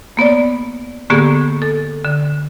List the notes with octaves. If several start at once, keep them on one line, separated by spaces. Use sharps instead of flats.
A#3 B3 C#5 D5
A2 D3 A#3 B3 G4 G#4
A4
D3